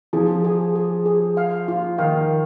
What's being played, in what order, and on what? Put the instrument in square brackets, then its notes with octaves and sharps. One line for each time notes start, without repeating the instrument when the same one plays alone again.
[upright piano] F3 [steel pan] G#4
[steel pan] G#4
G#4
G#4
F5
F4
[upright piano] D#3 [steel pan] F5